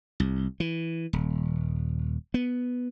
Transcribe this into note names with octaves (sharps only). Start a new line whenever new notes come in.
C2
E3
D#1
B3